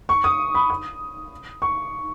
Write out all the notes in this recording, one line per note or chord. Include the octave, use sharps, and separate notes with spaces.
C#6
D#6
B5
D#6
C#6